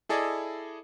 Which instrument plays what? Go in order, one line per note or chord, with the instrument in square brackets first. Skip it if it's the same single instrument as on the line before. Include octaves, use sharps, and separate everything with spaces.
[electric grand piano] E4 G#4 A4 D5 D#5